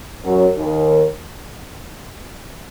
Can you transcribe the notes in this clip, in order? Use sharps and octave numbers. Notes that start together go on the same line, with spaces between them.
F#2 F#3
D#2 D#3